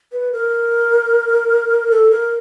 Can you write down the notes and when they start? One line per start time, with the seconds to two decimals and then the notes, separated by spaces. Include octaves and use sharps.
0.12 B4
0.32 A#4
1.91 A4
2.11 A#4